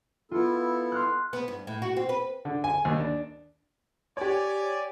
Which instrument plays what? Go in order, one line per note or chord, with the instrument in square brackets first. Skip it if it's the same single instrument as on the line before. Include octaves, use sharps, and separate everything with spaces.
[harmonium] B3 E4 A4 [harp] F4
[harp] C6 F6 F#6
[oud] B3
G2
A2
F#4
C4
B4
[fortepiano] D3
G#5
D#2
D4
[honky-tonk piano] G4 C#5 [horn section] D5 G#5